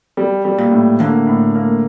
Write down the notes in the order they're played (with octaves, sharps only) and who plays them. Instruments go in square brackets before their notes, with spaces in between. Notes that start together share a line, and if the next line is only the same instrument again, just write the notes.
[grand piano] G3
G3
[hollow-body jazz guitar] A#2
[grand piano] A2
[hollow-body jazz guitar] D2 D3 [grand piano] A#3
[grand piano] A2
A#3